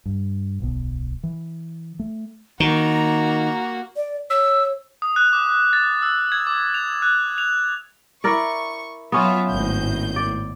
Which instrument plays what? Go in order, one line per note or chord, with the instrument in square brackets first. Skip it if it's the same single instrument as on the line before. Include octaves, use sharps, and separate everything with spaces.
[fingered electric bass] G2
D1 B1 B2
E3
A3
[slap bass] D#3 [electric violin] A#3 F#4 [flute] A#5
[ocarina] D5
[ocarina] C#5 [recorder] E6
[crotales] D#6
F#6
D6
A6
E6
G#6
D6
F7
F#6
F7
[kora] E4 A#4 D5 [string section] C#6
[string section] F#3 F4 E5 [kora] B3 C#4
[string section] G#1 A2 G6
[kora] D5